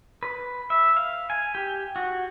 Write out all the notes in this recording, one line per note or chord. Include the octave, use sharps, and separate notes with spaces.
B4
E5
F5
G#5
G4
F#4